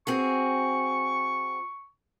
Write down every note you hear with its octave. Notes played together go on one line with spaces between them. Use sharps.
C4 F#4 G#4 C#6